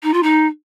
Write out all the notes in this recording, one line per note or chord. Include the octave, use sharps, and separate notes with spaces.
D#4
F4
D#4